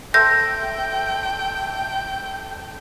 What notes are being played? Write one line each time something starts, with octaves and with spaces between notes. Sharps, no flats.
A4 C5 E5 G5 G6 A#6